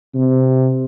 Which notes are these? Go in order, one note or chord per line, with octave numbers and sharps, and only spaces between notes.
C3